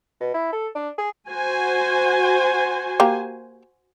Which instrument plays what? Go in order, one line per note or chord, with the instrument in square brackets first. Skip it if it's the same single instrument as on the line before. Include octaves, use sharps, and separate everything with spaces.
[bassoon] B2
E4
A4
D4
G#4
[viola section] F#4 C5 G#5
[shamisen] A#3 G4